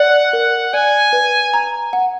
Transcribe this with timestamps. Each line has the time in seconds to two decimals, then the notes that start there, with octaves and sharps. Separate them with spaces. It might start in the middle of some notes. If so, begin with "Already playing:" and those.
Already playing: D5 F#5
0.33 A#4
0.73 D5 G#5
1.13 B4
1.54 A#5
1.93 F#5